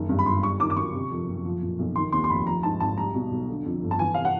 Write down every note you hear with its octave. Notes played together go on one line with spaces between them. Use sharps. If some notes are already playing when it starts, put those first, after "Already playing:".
Already playing: F#1 D#3
G2
B5
G1 C6
G3 C#6
D#3 D6
D6
F#2 C#6
C3
F2
F#1
F3
A#2
B1
D#3 C6
D#2 C6
C6
F1 B5
F3 A#5
G#2 A5
G#1 A5
G3 A#5
B2
B1
D3
F2
G1
A5
E3 G#5
C3 F5
F#5